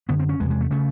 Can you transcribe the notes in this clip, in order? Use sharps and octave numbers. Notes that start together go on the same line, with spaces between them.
F#2 D3 B3
C4
C#4
E2 C3 G#3
G#3
A3
C#3 A3